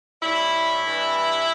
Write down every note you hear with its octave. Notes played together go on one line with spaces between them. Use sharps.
A2 G3 E4
G2 E3 G3